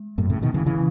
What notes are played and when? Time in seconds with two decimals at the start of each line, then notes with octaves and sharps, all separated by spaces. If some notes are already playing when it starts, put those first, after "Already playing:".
Already playing: G#3
0.18 F#2 A2
0.30 A2 C#3
0.42 B2 D#3
0.54 C#3 E3
0.66 C#3 E3